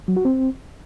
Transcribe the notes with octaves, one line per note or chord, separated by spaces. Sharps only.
F#3
F#4
C4